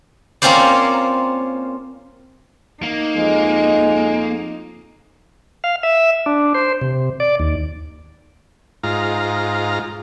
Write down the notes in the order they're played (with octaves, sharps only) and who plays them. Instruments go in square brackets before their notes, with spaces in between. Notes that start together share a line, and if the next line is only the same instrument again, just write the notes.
[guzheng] A#3 C4 C#4 F4 C5 D5
[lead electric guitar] A#3 [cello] D#4
[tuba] F2 [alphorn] G#3
[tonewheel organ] F5
E5
D4
C5
C3
D5
D#2
[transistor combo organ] G#2 F4 A#5